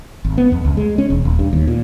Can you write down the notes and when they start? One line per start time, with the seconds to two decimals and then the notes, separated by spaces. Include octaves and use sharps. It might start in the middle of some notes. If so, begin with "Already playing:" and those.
0.25 G#1
0.38 B3
0.52 F2
0.65 C#2
0.77 G#3
0.98 C#4
1.10 E1
1.25 D#1
1.39 G2
1.53 D#2
1.67 A#2